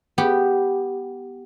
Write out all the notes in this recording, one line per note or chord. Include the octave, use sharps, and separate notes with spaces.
B3 G4